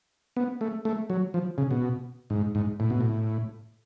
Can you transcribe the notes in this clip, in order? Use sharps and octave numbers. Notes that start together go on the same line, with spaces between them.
B3
A3
A3
F#3
F3
C#3
B2
G#2
G#2
A2
B2
A2